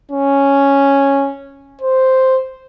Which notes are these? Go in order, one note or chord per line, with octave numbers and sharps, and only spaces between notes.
C#4
C5